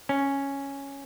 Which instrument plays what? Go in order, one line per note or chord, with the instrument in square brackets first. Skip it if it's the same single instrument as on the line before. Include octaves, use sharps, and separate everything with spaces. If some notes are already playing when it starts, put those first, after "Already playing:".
[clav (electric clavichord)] C#4